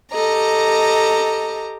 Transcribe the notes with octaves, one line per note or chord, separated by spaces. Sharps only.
G4 A4 D#5 A#5